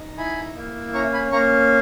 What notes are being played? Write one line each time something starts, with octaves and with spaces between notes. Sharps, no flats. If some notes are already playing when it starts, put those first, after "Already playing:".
Already playing: D#4
E4 G#5 B5
A#3
C#4 A#5 C#6
G#5 B5
A#3 A#5 C#6